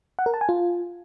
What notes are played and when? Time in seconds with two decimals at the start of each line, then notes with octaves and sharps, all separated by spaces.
0.19 F#5
0.26 A#4
0.34 A5
0.41 G#5
0.49 F4